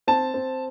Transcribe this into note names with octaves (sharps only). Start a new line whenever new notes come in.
C4 A5
C4